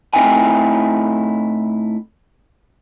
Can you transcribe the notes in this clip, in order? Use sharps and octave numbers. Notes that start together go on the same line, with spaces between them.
A2 C4 D#4 E4 G5 G#5